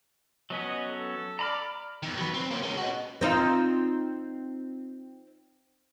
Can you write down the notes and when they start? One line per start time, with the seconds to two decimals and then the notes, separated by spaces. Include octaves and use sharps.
0.50 F#3 B3 C#4 D#5
0.89 A4
1.39 D5 A#5 B5 F6
2.03 E2 D#3
2.17 F#3 B4
2.34 C4
2.51 A#3 C#4
2.63 G#3 C#4
2.77 F#4 D#5
3.21 C4 D#4 F4